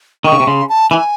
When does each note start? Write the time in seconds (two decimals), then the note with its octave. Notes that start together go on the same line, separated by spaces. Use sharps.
0.24 D#3 C#6
0.32 C#3
0.40 C3
0.47 C#3 C6
0.69 A5
0.91 E3 G#5